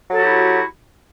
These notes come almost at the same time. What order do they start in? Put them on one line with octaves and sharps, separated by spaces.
F#3 A4 F#4 G4 E4